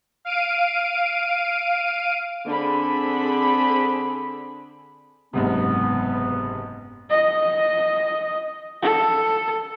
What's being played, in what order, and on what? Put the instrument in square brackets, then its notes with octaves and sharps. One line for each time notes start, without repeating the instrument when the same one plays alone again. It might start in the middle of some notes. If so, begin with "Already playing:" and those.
[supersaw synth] F5 D7 D#7
[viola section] D3 C4 G#4 B5
[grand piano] F#1 G#2 C3 [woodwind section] B3
[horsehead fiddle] D#5
A4